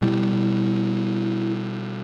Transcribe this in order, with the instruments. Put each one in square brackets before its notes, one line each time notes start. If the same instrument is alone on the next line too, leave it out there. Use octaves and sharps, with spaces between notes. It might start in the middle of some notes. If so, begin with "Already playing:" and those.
[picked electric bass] B2 G3 [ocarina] E4